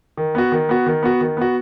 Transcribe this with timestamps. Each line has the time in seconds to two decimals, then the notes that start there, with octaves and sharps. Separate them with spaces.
0.17 D#3
0.35 B3 F#4
0.52 D#3
0.69 B3 F#4
0.86 D#3
1.03 B3 F#4
1.21 D#3
1.37 B3 F#4